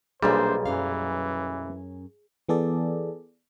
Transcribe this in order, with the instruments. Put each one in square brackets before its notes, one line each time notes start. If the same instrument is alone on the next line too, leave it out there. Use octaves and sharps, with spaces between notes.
[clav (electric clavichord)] B1 A#2 G3 [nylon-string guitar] A#3 D4 E5 [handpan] G#4 [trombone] C5
[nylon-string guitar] F#2 C#4 F5 [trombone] E3
[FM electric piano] E3 B3 G#4 A4 D5